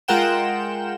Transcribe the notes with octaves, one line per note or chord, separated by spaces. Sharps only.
G#3 F4 A#4 F#5 G5 E7